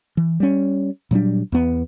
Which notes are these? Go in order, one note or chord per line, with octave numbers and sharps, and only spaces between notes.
E3
G3 C#4
A#2 F#3 G3 D4
E2 B3